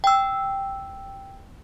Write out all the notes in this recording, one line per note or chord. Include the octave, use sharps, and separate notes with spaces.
G5 E6